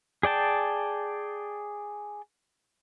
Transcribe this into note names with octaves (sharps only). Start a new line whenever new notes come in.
G#4 D5 G5 A5